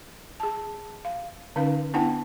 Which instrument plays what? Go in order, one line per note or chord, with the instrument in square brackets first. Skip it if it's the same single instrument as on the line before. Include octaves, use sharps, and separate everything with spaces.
[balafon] G#4 A5
F5
D3 C#4 D#4 B4 F5
B3 D4 E4 F#5 G5 A5